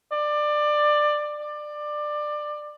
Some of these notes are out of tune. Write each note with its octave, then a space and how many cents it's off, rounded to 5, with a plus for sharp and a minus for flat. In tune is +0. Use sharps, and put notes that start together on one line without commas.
D5 +20
D5 +20